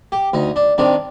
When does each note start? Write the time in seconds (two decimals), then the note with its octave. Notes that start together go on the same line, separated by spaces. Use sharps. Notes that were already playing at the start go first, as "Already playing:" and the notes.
0.12 G4
0.33 D2 D#4
0.56 D4
0.78 C3 D#3 D4